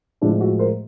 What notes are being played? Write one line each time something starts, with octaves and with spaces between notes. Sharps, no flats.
A2 F3 G#3 D4 E4
E4 F#4
A#4 C5